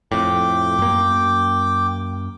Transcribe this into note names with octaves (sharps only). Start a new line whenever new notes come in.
F2 A2 G5 D6
F#2 A#3